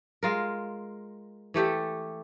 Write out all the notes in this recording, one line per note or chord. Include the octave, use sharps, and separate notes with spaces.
G#3 F4 A#4
E3 A3 G4 A4